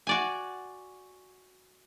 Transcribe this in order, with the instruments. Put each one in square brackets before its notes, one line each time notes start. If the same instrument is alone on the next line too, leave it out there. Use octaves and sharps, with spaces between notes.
[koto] F#4 D5 G#5